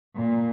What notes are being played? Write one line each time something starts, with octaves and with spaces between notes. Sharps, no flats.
A#2